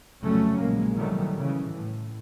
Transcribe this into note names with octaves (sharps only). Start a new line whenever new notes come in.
F1 C#3 F#3 G3 A3 C#4
A#1 G#3 A#3
C3 D#3 E3 F#3 G3 A3
C#3 E3
A2